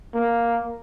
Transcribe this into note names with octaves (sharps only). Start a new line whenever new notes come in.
A#3